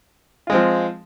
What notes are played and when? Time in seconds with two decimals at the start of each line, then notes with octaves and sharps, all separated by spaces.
0.47 F4
0.50 G#3
0.52 C4
0.55 F3